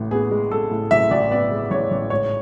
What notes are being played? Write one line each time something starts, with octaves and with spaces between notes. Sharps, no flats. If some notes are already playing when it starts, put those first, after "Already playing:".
Already playing: A1 A2
B3 G#4
G#3
G#3 A4
A2
A1 E5
A1 D5
B3 D5
G#3
A1 C#5
A1
G#2 C#5